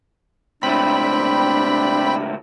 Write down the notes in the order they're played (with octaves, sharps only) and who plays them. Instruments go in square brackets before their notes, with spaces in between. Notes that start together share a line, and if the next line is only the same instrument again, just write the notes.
[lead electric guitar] C#2 A2 [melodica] C4 G5 [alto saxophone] D4 [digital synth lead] B5